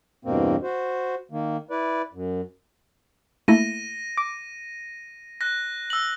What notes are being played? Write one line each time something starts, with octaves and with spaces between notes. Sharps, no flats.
E2 G2 B2 A#3 C4
F#4 C5
D#3 A#3
E4 B4 D5
F#2
A3 A#3 E4 A#6 D#7
D6
F#6 A#6
E6 F#7